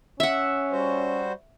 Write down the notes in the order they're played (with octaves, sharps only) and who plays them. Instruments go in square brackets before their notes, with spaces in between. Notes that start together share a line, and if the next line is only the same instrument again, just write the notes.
[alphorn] C#4 [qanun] E5 F#5
[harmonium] G3 F#4 C5